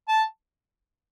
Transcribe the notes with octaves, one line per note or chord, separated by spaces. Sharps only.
A5